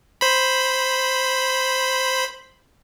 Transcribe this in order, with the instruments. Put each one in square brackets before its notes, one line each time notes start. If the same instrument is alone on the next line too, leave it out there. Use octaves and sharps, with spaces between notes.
[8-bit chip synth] C5 B5